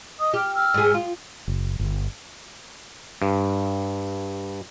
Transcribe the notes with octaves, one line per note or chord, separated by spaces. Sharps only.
D#5 D#6
G4 F6
E6 F6
G#2 G#4
F4
F#1
G1
G2